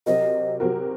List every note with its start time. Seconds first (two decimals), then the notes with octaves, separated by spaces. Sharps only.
0.06 C3 F#3 C4 F#4 A#4 D#5
0.60 C3 F#3 C4 F#4 A#4